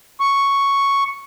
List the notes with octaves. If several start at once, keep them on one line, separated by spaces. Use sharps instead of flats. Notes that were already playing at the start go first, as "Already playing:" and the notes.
C#6